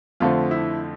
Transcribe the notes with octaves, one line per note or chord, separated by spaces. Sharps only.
F2 D3 A3 C4 F4
E4